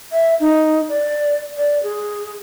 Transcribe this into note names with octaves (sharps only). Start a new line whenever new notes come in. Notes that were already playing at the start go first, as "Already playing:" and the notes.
E5
D#4
D5
D5
G#4